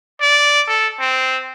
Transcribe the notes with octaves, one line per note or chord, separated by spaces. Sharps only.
D5
A4
C4